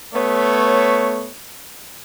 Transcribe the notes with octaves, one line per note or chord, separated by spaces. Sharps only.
A3 B3 C#5